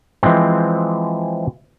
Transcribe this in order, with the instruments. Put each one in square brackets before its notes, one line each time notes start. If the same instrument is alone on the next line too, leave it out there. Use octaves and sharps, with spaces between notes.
[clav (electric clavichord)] E3 F3 G#3 C4